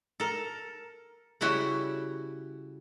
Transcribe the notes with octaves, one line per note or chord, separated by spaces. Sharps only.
A4 A#4
C#3 G3 E4 F#4